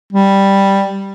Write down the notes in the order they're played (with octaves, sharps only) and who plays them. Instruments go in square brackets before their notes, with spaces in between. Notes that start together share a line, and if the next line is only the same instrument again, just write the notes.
[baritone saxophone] G3